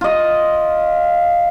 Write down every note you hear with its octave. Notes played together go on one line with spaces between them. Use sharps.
F4 D#5